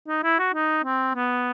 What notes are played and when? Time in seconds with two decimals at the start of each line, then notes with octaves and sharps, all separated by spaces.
0.08 D#4
0.24 E4
0.39 F#4
0.54 D#4
0.84 C4
1.15 B3